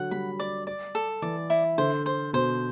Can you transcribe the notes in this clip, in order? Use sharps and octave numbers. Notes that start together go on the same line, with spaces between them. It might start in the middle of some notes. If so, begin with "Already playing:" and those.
Already playing: D3 F#3 F#5
G3 B5
D5
D5
A4
E3 D5
E4
D3 C5
C5
B2 C5